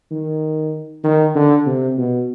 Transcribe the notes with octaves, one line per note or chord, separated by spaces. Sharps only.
D#3
D#3
D3
C3
B2